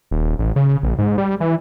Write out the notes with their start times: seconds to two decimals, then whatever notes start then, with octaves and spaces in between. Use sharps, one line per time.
0.11 D#1
0.39 A1
0.56 C#3
0.83 A#1
0.98 G#2
1.18 G3
1.40 E3